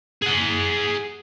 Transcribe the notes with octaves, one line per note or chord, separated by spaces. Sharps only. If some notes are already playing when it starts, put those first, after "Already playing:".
G#4 F#5